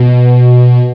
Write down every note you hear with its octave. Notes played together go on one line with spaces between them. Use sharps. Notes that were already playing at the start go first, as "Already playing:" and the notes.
Already playing: B2